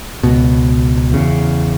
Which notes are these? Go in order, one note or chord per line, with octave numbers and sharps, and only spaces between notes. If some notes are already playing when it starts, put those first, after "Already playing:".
C#2 B2
E2 C#3